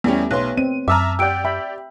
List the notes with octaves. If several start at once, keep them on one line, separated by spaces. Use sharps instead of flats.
E2 G3 A3 B3 C#4 G4
B1 B4 C#5 C6 F#6
C4 D#7
F#2 E5 A5 A#5 D6 E6 F6
G4 D5 F#5 G5 E6 D7
E5 G5 B5